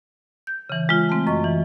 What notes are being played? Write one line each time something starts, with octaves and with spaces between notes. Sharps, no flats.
G6
C#3 E3
G#3 F4
A3 C4
F#2 D#5 C#6
E3